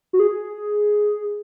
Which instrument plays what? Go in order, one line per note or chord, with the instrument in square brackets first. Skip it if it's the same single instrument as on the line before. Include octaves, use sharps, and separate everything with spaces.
[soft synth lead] F#4
G#4